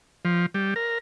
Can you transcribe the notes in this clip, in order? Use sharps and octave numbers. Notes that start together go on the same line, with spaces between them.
F3
G3
A#4